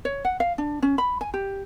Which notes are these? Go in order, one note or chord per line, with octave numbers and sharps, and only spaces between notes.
C#5
F#5
F5
D4
C#4
B5
G#5
G4